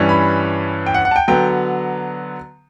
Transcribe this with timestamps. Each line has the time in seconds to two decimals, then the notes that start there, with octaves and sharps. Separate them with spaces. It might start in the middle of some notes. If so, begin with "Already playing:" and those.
Already playing: G2 E3 G3 C#4
0.09 B5
0.86 G5
0.94 F#5
1.05 F#5
1.11 A5
1.16 G5
1.28 D3 F#3 B3 G5